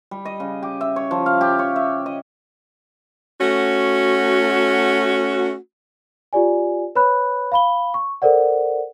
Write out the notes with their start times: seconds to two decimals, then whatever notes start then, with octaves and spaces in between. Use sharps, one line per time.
0.11 G3
0.25 D#5
0.40 C#3
0.63 G4
0.81 E5
0.96 C#5
1.11 F3
1.26 F5
1.41 G4
1.59 C#5
1.76 E5
2.06 D#5
3.41 A3 C#4 F#4
6.33 F4 G4 D5 G#5
6.96 B4 C#5 B5 F#6
7.52 F5 B5 G7
7.94 C#6
8.22 A4 A#4 C5 D5 F#5